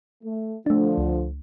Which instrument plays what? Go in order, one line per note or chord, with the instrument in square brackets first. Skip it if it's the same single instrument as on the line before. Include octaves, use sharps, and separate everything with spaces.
[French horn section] A3
[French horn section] D3 F3 [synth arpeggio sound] A3 D4
[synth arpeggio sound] C#2